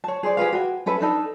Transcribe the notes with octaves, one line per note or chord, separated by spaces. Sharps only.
C#5 A5
G#4 C5 D5
G4 G#4 B4 F5
F#4 G#5
C#4 A4 B4 E5
D4 D#4 A4